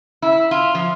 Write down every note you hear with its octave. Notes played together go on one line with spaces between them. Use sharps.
E4
F4
F3